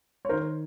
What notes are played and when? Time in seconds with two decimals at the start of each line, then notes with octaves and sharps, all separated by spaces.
0.25 C#5
0.29 D#3 A#4 C5